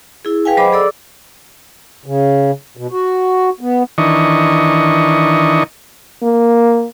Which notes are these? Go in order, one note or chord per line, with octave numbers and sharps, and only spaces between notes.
E4 G#4
G#4 B4 F5 G5 G#5
F#3 C5 D#5 B5 D6
G#4 A4 D5 D6 E6
C#3
B2
F#4
B3
D#3 E3 D4 D#5 C#6
A#3